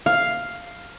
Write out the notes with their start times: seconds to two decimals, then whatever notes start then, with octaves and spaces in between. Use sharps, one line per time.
0.06 F5